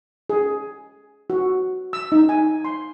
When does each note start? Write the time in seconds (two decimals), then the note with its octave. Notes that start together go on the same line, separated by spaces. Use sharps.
0.30 G#4
1.30 F#4
1.93 E6
2.12 D#4
2.29 G#5
2.65 C6